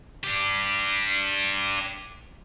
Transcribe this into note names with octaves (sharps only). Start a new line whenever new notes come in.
D4 G4